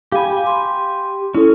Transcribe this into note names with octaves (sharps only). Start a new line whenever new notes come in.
G4 F5 G#5 B5
C6
C#4 E4 A4